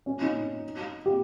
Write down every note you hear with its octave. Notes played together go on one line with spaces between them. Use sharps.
C#4
D#4
G4